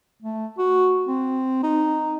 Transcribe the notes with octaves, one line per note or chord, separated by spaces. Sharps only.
A3
F#4
C4
D#4